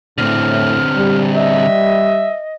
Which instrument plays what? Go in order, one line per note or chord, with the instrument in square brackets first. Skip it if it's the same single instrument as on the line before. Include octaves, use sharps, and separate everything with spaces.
[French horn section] A2 [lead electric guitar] D3 C4 [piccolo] F6
[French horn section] G3
[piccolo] D#5 [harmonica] E5